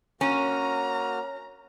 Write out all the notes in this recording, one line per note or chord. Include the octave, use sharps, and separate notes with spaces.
A#3 C#4 F#4 A#5 F6